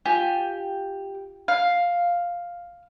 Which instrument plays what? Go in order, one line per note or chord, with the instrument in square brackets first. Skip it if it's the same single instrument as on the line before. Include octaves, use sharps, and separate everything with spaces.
[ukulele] F4 G#5 [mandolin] G4
[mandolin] F5